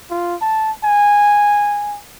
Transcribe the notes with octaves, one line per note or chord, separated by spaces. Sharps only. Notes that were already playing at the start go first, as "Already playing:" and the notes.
F4
A5
G#5